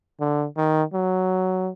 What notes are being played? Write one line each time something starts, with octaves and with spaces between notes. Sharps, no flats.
D3
D#3
F#3